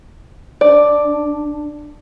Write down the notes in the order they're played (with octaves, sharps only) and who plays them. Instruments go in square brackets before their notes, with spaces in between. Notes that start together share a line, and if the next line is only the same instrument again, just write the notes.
[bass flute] D4 [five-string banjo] D5